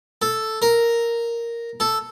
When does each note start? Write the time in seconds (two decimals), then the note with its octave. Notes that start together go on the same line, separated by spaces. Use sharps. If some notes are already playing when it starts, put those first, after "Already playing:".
0.22 A4
0.62 A#4
1.80 A4